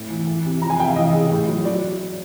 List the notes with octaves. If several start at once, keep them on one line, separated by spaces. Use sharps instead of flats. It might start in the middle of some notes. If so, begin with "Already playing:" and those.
Already playing: A2
E3
E3
C3
F3 A#5
G#5
C3 E5 G5
F5
E3 D#5
C#3
A2
F#3
F#3 D5